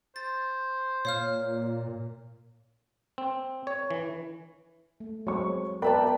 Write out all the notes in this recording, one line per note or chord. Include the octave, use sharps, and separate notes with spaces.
C5 A6
A#2 C#5 F5 F6
C4
C#5
E3
A3
F#3 G#3 C4 C#5 C#6
B3 A#4 B4 D5 E5 G5 A5